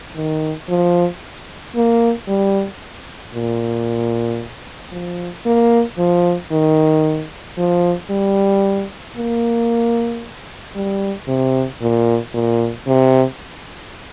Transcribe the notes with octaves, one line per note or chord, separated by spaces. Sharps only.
D#3
F3
A#3
G3
A#2
F3
A#3
F3
D#3
F3
G3
A#3
G3
C3
A#2
A#2
C3